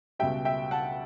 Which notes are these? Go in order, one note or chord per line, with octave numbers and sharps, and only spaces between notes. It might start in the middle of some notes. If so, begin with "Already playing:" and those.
C#2 B2 G3 E5 G5
E5 G5
F#5 A5